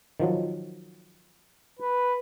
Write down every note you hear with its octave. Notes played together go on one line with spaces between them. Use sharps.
D#3 F3 F#3
B4